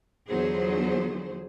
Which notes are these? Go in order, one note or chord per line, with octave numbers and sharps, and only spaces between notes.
E2 D3 F3 F#3 G#4 C5